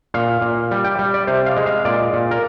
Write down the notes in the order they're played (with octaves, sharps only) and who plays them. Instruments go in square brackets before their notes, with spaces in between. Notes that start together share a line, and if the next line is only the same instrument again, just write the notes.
[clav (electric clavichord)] A#2 F5
A#2
G3
G5
G3
D5
C3 C5
F5
G#3
F5
A#2 D5
A#2
A#4